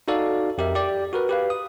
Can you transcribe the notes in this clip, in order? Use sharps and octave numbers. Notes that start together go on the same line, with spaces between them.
D#4 F#4 A4 D5 F5
F2 G4 A#4 E5
G4 D5
F#4 A#4 B4
G4 B4 F5
D#6